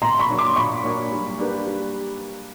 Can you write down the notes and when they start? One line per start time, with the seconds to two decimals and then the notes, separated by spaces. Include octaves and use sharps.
0.02 A#2 A#5 C6
0.19 B5 C#6
0.29 F#3 A#3 D4
0.38 C6 D6
0.56 A#2 B5 C#6
0.83 F#3 A#3 D4
1.11 G3
1.38 A#3 D4 G4 B4
1.66 G3